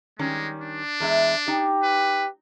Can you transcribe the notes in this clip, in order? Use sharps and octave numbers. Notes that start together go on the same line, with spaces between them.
D#3 G3 G#3 C#4
D4
E2 G#3 E5
D#4 G4
B4